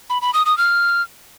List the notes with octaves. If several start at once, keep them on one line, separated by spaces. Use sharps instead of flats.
B5
B5
D#6
D#6
F6